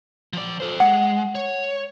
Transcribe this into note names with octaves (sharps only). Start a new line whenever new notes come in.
F3 D5
A4 C5
G#3 F#5
C#5